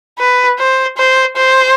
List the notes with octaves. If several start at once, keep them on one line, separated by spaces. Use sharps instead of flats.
B4
C5
C5
C5